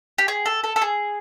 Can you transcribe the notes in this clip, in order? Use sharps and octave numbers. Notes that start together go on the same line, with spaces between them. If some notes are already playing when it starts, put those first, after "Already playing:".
G4
G#4
A4
A4
A4
G#4